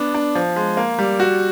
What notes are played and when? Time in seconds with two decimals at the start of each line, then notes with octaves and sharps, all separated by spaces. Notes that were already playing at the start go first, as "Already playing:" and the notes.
Already playing: B3 D4
0.15 D4
0.35 F3
0.56 G#3
0.77 A#3
0.99 G3
1.20 F#4